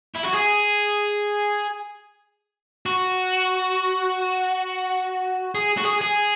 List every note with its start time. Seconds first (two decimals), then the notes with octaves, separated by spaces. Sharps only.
0.15 E4
0.24 F#4
0.34 G#4
2.86 F#4
5.55 G#4
5.78 F#4
5.86 G#4
6.02 G#4